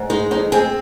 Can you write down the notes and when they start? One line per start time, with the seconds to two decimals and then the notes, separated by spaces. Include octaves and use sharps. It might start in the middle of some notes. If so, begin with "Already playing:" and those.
Already playing: G#2
0.10 G#3 D#4
0.31 F2 D#4
0.52 C4 G#4